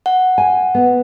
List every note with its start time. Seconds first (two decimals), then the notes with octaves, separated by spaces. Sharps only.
0.06 F#5
0.38 G#5
0.75 B3